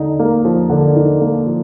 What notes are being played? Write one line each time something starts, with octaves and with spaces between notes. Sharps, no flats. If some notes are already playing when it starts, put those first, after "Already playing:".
Already playing: D3 D#4
A#3
F3
D3
D#4
A#3
F3